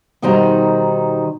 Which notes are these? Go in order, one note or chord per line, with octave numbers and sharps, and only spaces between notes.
B2 D#3 G3 D#4 C5 A#5